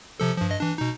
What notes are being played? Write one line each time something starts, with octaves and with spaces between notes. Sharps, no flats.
C3 F3 A4
G2 F3
G2 D#5
E3 D4
B2 D#4